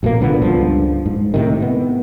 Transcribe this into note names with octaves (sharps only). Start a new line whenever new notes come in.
A#1 B2 E3 A#3
C2 A#2 D3 B3
C#2 G2 F3
G#2
A2 C3 D#3
B3